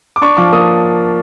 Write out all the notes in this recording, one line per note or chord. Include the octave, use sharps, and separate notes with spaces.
D6
D4 C#6
F3 D6
A#3 D#6